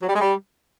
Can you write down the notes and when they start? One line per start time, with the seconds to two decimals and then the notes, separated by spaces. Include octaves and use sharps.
0.02 F#3
0.09 G3
0.15 G#3
0.21 G3